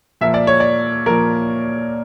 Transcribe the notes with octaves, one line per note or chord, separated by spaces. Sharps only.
A#2 F3 A#3 E5
D5
C#5
D5
A#2 F3 A#3 A#4